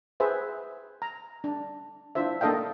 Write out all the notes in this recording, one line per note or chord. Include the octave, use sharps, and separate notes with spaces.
G#4 B4 C5 E5
A#5
D4
D4 E4 F4 C5 E5
A#3 D4 A4 D#5 F5 G5